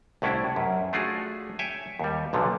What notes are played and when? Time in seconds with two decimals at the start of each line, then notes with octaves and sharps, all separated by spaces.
0.22 C2 A2 C#4 D4 E4
0.56 F#2
0.93 A3 D4 F4 F#4 G#4
1.59 C#5 E5 G5 G#5
2.00 D#2 G3
2.33 B1 A#2 D3 F3